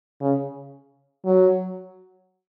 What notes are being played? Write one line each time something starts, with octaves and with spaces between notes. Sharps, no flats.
C#3
F#3